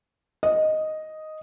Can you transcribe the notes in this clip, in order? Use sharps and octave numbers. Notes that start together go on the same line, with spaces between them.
D#5